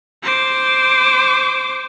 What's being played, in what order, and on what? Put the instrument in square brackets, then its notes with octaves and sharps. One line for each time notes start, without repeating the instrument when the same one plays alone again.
[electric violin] C5 D6